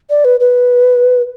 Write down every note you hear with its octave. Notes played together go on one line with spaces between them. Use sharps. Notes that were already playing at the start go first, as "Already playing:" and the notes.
D5
B4
B4